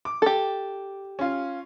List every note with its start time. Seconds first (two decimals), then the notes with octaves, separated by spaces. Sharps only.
0.05 D6
0.22 G4 A4
1.19 C#4 F4